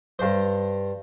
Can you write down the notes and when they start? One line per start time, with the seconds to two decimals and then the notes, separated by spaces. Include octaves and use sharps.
0.19 G2 C5